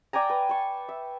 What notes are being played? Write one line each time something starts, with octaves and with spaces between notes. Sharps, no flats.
D5 G5 G#5 A#5
B4
A5 C#6
E5